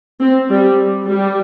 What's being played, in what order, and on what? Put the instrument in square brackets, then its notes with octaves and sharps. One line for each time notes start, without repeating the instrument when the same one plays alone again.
[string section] C4
G3
G3